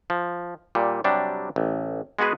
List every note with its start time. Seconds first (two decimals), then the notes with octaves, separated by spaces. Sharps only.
0.10 F3
0.75 A#2 G3
1.04 C3 F#3 G3 D4
1.56 A1
2.19 G#3 B3 F#4 G#4 B4